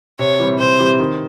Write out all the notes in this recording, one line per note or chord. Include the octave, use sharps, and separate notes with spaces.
C3 C#5
E3 G3 C4
C3 C5
E3 G3 C4
D#3